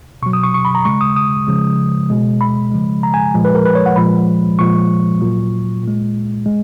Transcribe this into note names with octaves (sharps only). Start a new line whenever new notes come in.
B2 F#3 C#6
D#6
C#6
C#6
B5
A#5
C#3 G#3 C#6
D#6
D#6
C#3 F3 G#3
B2 G#3
B5
C#3 F3 G#3
A#5
G#5
A#2 F3 G#3
B4
A#4
B4
C#5
F#5
A#2 F3 G#3 B5
A#2 F3 G#3 C#6
A#2 F#3
A#2 G#3
G#3